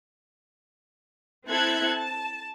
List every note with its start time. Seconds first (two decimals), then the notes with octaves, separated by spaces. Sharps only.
1.47 C4 E4 A4 E5 F#6 G#6
1.90 A5